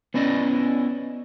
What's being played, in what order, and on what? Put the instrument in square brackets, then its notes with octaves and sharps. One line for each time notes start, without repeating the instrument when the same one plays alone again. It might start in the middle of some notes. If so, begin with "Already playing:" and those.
[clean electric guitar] B3 C#4 E4 D5 D#5